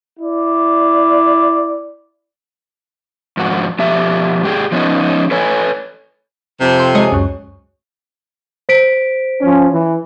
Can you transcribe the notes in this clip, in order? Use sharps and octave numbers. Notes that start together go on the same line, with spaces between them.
E4 D5
F2 G#2 F#4
B2 F3 G4 E5
G#2 G4 G#4
F3 B3 C#4 D#4
A4 B4 C#5 G#5
F2 C3
G5 C6
G#3 C#5 D#5
C#2 F#2
C5 B6 D7
F3 C#4
E3